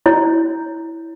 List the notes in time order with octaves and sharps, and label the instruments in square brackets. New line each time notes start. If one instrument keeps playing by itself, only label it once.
[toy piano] E4 C#5